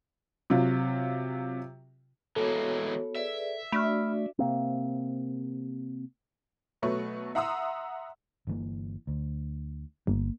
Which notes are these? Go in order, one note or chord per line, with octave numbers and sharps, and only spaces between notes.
C3 F#3 F4
E3 G#3 A#3 B3 F#4 A4 C#5
G#4 B4 D5 E5
A3 D4 F#4 D5 B5 F6
C3 A#3 C4
B2 F#3 A3 B4 C#6
E5 F#5 A#5 C6 D#6 E6
G1 E3 A#3
D2
G1 A#3